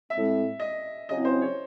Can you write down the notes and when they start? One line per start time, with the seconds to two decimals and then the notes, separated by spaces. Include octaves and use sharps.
0.10 A2 G#3 C4 E5
0.60 D#5
1.09 C#3 F#3 C4 E4 G#4 D#5
1.25 C5
1.42 C#5